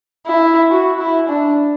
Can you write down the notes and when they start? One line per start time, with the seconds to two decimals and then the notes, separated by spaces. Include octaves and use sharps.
0.27 E4
0.70 F#4
0.99 E4
1.29 D4